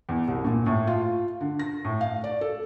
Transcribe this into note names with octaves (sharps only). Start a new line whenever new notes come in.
E2
C2
A#2
A2
F4
D3
A#6
A2
F5
D5
A4